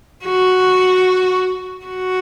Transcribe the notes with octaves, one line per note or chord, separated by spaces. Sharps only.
F#4
F#4